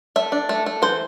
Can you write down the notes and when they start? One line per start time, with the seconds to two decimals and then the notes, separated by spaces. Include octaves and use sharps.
0.16 A3 E5
0.32 D4
0.49 A3
0.66 A3
0.82 E3 C5